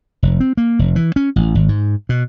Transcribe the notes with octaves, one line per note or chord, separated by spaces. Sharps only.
F1
C4
A#3
F1
E3
C#4
A1
G#1
G#2
B2